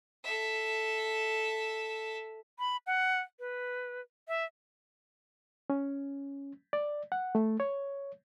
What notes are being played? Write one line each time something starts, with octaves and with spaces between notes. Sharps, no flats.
A4 E5
B5
F#5
B4
E5
C#4
D5
F#5
A3
C#5